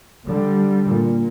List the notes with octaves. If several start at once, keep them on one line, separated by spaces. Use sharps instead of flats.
D3 G3
A#2